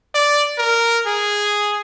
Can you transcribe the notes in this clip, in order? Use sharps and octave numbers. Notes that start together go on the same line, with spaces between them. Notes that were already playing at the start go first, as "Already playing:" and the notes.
D5
A#4
G#4